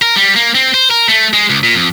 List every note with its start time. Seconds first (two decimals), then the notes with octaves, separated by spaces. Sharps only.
0.02 A#4
0.16 G3
0.36 A#3
0.55 C4
0.74 C5
0.91 A#4
1.08 A3
1.33 G#3
1.50 C#2
1.63 A#2
1.76 F2